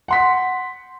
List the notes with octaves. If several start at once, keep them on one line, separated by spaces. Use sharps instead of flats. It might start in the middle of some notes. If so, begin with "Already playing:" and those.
F#5 C6 B6